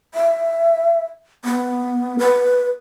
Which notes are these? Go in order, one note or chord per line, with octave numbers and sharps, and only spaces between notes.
E5
B3
B4